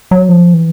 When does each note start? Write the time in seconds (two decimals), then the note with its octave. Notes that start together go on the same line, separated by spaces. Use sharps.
0.11 F#3
0.29 F3
0.54 E3